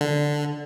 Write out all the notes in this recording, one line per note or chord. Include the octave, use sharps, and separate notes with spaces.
D3